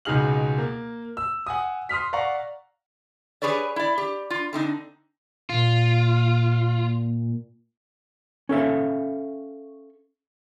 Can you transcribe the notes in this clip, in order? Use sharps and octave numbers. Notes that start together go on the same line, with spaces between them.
C#2 B2 D#4 G#4 F6 F#7
A#3
E6
F#5 G#5 D#6
C6 D#6 F6 B6
D5 F5 F#5 A#5 C#6
G4 G#4 B4 C#5 D5
E4 D5
G4
F4
D3 C4 D#4
A#2 F4
C#4 A4 E5 F5